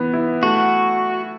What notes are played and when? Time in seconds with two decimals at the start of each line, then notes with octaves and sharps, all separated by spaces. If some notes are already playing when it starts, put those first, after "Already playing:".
Already playing: E3 B3
0.13 E4
0.43 A3 F#4